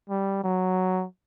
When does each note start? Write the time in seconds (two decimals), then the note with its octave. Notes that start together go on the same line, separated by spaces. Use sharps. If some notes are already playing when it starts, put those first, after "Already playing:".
0.09 G3
0.44 F#3